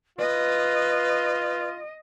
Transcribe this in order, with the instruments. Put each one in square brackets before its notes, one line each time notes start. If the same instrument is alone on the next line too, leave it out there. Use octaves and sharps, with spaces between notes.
[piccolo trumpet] F4 [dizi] B4 [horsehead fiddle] D#5